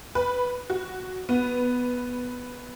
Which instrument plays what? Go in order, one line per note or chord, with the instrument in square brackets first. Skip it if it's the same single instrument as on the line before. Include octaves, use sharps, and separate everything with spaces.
[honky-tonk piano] B4
F#4
B3